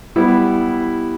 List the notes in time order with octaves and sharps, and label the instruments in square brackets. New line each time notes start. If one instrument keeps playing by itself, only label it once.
[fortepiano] G3 B3 E4